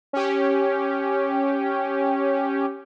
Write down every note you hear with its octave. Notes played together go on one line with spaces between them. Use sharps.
C#4 G4